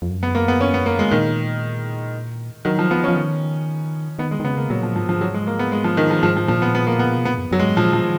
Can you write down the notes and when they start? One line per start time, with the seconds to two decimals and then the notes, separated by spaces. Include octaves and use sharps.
0.02 F2
0.10 F#2
0.23 B3
0.35 A#3
0.48 B3
0.61 C#4
0.74 B3
0.86 A#3
0.99 G#3
1.11 A#2 D#3
2.65 D#3 F#3
2.79 F3
2.91 F3 B3
3.04 F3 C#4
3.16 D#3
4.19 D#3 B3
4.31 G#3
4.40 D#3
4.44 C#3 B3
4.57 A#3
4.70 A#2 F#3
4.83 F3
4.96 G#2 F3
5.09 F3
5.21 F#3
5.34 G#3
5.47 A#3
5.59 B3
5.72 G#3
5.84 F3
5.97 D#3
6.11 F3
6.23 G#2 F3
6.37 F3
6.48 A#2 F3
6.62 B3
6.75 B3
6.87 A#3
6.99 B3
7.16 B2
7.25 A#2 B3
7.38 F#2
7.51 F#2 F#3
7.59 G#3
7.64 G#2
7.77 A#2 F3
7.93 F3
8.02 D#3